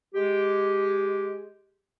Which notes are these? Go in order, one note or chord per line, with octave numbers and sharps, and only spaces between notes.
G#3 G4